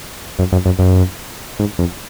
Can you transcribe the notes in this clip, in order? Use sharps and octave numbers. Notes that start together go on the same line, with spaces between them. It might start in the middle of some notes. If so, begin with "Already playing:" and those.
F#2
F#2
F#2
F#2
G#2
F2